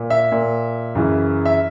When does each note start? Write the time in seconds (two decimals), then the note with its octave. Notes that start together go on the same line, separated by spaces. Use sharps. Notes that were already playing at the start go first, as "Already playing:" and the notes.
Already playing: A#2
0.10 E5
0.32 A#2
0.95 F#2 C#3 E3
1.46 E5